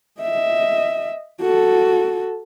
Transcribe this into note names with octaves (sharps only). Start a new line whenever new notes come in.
D#5 E5
F#4 A4